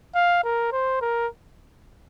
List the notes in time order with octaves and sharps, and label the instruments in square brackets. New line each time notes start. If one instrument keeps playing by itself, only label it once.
[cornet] F5
A#4
C5
A#4